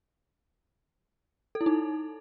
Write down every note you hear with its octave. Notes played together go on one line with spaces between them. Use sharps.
A4
E4
D#4